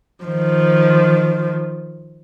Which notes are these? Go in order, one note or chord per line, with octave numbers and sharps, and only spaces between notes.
D#3 F3